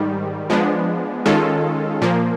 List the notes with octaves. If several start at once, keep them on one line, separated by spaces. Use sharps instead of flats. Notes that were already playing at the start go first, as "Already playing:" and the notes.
Already playing: G#2 D#3 G3
F3 G#3 B3 D4
D#3 G#3 C#4 F4 A4
A#2 F3 A#3